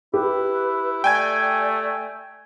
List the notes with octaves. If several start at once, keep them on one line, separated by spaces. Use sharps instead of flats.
E4 G4 B4
A3 D5 G5 G#5 G#6